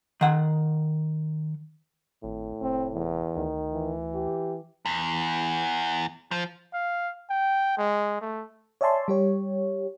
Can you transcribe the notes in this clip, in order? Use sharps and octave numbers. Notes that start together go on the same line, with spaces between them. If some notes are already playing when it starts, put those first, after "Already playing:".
D#3 F#5
G#1 A2
F1 C4
E2
D2 D#3
E3
G4
E2
F3
F5
G5
G#3
A3
C#5 D5 E5 G#5 A5 C6
G3 G4 C#5